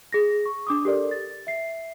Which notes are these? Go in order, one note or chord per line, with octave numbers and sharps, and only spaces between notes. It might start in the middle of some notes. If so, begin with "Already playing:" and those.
G#4 A#6
C#6
D4 D6 D#6
G4 A4 A#4 D5
A6
E5 C7